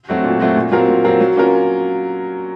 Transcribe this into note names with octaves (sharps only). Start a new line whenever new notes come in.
F#3 A3 C4 F#4
A#2
F#3 A3 C4 F#4
A#2
F#3 C4 F4 A#4
A#2
F#3 C4 F4 A#4
F#3
A#3 C#4 F4 A#4